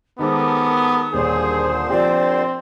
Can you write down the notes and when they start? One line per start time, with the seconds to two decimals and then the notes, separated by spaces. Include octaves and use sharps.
0.19 D#3 G#3 B3 G4 A4 A#4 C5 D#6
1.13 D#1 A#2 D3 G3 G#4 C5 C#5
1.90 F3 C4 G4 D5